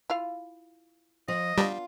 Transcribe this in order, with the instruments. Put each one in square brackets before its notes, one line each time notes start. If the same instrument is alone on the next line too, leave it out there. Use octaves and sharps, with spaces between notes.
[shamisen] E4 F4 F5
[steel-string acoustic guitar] F3 [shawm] D#5
[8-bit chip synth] G3 [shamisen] B3 D4 [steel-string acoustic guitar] F4